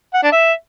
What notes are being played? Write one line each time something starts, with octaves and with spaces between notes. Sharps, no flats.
F#5
D4
E5